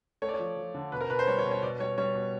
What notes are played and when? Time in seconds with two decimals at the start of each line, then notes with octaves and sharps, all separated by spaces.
0.22 A3 C#5
0.29 D5
0.34 C#5
0.39 F3
0.57 F3
0.75 D3
0.92 B2 B4
1.01 A#4
1.10 B2 B4
1.19 C5
1.27 G3 C#5
1.39 C#5
1.45 B2
1.51 C#5
1.62 B2 D5
1.80 G3 C#5
1.98 G3 C#5
2.15 B2